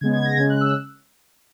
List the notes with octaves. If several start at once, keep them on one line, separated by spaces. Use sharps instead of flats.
C#3 G#3 B3 G#6
G#6
A#6
C#3 G#3 C#4 G#6
F#6
E6